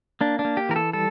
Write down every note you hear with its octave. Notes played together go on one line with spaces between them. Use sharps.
A#3 D4
D4
A#3
G4
E3 A#4
A4
G3 A4